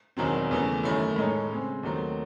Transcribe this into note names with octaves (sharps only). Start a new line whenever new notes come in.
E1 E2 D#3 F#3 C4
E2 C#3 E3 A3
F#2 D#3 A3 C#4 E4
A2 G#3 D#4 A4 C#5
C#3 G#3 C4
D#2 D#3 F#3 A3 C4